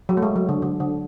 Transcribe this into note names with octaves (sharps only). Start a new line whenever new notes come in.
F#3
A3
G#3
F#3
D3
D3
D3